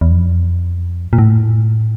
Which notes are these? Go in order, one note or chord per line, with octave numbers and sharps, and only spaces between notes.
E2
F2
A#2
A2